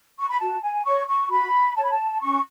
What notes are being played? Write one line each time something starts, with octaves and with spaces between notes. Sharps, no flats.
C#6
B5
F#4 A5
G#5
C#5 C#6
C#6
F#4 B5
C#5 A5
B5
A5
C#4 C#6